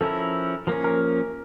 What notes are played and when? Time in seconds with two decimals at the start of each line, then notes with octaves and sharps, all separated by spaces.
0.01 F3 C#4 E4 A4 A#4
0.67 F3 A#3 C#4 A#4
0.84 A#4